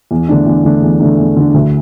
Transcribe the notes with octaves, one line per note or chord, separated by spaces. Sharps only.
E2
D3 A3 D4
E2
D3 A3 D4
E2
D3 A3 D4
E2
D3 A3 D4
D2